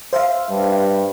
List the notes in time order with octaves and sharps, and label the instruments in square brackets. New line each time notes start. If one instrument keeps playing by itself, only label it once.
[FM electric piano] C5 E5 F5
[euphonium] G2